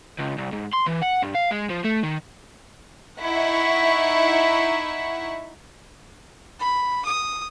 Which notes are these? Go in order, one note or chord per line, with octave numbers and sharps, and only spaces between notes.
C#2
C2
G#2
C6
E3
F#5
G2
F5
G#3
F3
A3
D#3
D#4 E4 E5 F#5 C#6
B5
D#6